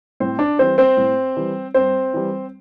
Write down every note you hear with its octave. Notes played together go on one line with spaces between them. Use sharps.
A2 C4 C5
D4 D5
E3 G3 C4 C5
C4 C5
A2
E3 G3
G2 C4 C5
E3 G3